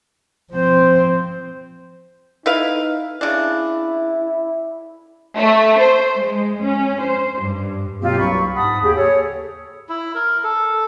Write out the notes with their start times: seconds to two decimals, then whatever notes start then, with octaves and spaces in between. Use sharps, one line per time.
0.53 F3 C4 C5
2.46 D#4 E4 B4 F5
3.21 C#3 D4 E4
5.36 A3
5.78 C5
6.19 G#3
6.62 C#4
7.03 C5
7.40 G2
8.02 B2 F#3 A#3 C4 F4 G4
8.19 C2 G2 F#3 B5 C#6
8.56 G#2 F#5 A5 B5 D#6
8.82 D#2 C#3 G4 G#4
8.96 G#4 A4 C#5
9.89 E4
10.15 A#4
10.44 A4